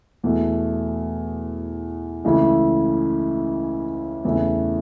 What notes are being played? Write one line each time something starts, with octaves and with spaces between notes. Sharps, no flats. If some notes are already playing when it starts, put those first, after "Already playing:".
E2 B2 A3
C#2 C#3 E3 A3 E4
E2 C#3 E3 A3 E4